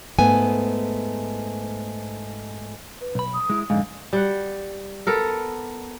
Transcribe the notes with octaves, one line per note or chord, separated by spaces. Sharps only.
G#2 A3 B3 G#5
B4
B1 B5
D#6
G#3 E4
F2 G#2 D3 F5
G3 F#5
B3 A4 A#4